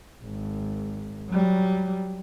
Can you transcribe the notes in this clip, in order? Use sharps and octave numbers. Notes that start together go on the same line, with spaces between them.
G#1
F#3 G3